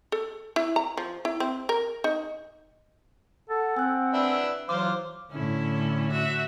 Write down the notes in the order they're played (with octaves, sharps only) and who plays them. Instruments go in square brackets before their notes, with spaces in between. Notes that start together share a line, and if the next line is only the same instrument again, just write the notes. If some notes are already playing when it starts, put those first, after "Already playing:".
[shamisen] A4
E4
A#5
F3
E4
C4
A#4
D#4
[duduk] A4 [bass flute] F#5
[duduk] C4 [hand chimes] G#5 F#6
[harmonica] D4 B4 E5
[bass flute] E3 [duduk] F#3 [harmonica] C5 F5 [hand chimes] D6
[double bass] A2 D3 [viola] C#4 E4
[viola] F#4 E5